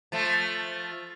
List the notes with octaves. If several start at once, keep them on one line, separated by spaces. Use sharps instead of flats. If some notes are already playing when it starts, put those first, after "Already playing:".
F3 A3